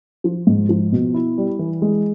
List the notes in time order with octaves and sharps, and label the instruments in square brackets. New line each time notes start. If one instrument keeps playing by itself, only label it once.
[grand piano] F3
G#2
F3
B2
E4
G3
E3
G#3